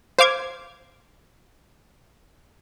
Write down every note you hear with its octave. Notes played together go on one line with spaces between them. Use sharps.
C5 F5 D6 G#6